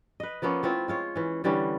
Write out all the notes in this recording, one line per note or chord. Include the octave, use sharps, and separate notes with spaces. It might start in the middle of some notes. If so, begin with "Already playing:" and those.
B4 D#5
F3 A#3 B3 C#4
A3 C4 E4 F4
G#3 F4 C#5
E3 C#4
D3 E3 G3 C#4